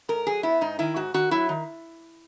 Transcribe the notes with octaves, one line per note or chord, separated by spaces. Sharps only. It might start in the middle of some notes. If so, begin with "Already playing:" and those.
G#2 A#4
F#3 G#4
B3 E4
G#2 D#4
D#3 E4
G#2 F#4
D#3 F#4
F#3 E4
D#3